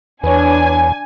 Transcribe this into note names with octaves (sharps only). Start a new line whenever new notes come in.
E2 D4 B4 C#5 G#5